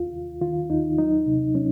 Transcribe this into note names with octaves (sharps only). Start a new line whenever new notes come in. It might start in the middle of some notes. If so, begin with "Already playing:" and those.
Already playing: D#2 F4
D#2
D#3 F4
D#2 D#4
F#3 D#4
C3
F#3 C#4